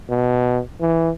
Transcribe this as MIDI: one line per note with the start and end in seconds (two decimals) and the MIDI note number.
0.10 0.60 47
0.81 1.10 52